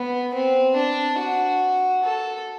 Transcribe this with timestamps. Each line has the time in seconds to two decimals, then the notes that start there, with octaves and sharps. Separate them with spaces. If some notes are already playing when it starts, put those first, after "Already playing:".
Already playing: B3
0.34 C4
0.76 D4
1.19 F#4
2.03 A4